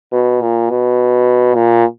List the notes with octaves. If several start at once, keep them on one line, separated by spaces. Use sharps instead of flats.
B2
A#2
B2
A#2